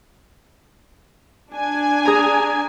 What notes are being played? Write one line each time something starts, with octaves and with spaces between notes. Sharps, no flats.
D4 G#5
G#4 A#5